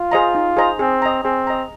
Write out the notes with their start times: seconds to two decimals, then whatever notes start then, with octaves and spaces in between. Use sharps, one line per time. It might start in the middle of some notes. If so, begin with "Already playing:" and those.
Already playing: F4
0.12 G#4 C5 D#5 A#5
0.35 D#4
0.57 G#4 C5 D#5 A#5
0.79 C4 G#4
1.02 D#5 A#5
1.24 C4 G#4
1.47 D#5 A#5